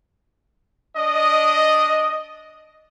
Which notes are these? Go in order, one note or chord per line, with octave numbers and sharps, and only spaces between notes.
D4 D#5